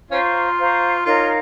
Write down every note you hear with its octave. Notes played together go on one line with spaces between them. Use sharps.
C#4 F4 C5 F5 A#5 C#6
C5 F5 A#5 C#6
D#4 F4 A#4 C#5 F5